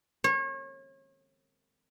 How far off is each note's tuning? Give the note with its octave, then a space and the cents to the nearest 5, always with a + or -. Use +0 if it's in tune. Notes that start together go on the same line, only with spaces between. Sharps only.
C#5 -35